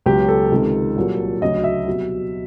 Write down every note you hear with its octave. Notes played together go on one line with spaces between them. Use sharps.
C#2 B2 F#3 G4
A4
C#2 C3 D#3
C2 A#2 F#3
D2 C#3 F#3 D#5
E5
C2 B2 F#3